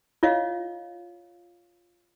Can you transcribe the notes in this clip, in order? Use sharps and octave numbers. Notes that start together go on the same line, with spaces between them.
F4 C#5 D#5 F5